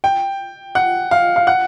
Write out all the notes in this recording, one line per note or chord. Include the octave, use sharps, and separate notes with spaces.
G5
F#5
F5
F5
F#5